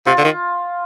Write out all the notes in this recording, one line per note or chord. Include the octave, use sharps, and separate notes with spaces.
C3 F4
D3
D#3